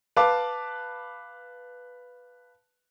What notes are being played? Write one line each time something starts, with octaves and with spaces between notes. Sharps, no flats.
B4 F5 A5 D6